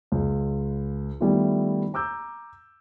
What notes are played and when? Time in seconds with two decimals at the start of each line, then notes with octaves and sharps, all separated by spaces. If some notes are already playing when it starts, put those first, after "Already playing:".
0.12 C#2
1.20 D#3 G3 A3 B3 E4 F4
1.94 A#5 D6 E6 G6